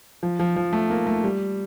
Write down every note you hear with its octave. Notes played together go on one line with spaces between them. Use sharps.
F3
F3
F3
A3
A#3
A3
G3